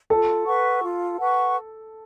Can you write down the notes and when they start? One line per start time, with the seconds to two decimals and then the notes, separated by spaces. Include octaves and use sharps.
0.10 F4 A4
0.46 B4 F#5 C#6
0.83 F4
1.19 B4 F#5 C#6